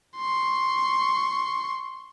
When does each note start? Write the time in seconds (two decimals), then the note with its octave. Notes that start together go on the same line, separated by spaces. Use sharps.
0.17 C6 C#6